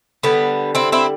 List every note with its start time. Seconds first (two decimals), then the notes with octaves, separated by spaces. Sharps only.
0.23 D3 G3 B3
0.75 C4 E4
0.92 C4 E4